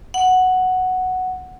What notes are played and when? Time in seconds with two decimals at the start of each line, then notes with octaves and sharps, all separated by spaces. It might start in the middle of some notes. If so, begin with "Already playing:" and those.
0.14 F#5